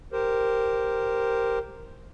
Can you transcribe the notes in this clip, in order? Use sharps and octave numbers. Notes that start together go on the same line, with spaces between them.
G4 A#4 C5